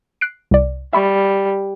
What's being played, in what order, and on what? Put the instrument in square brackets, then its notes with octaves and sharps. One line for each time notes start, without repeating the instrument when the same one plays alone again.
[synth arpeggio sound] F#6 C7 D7
C2 D5
[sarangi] G3 [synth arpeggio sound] E5 B5 C#6